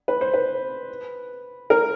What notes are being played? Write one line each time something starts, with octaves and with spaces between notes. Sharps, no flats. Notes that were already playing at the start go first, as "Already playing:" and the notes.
B4
C5
B4
A#4